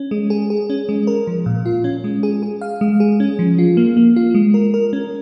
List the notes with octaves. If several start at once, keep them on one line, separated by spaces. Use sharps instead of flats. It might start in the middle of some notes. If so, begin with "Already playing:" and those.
Already playing: C#4
G#3
G#4
G#4
C#4
G#3
A#4
F3
A#2
F4
C#4
G#3
G#4
G#4
F5
G#3
G#4
C#4
F3
F4
A#3
A#3
F4
G#3
A#4
A#4
C#4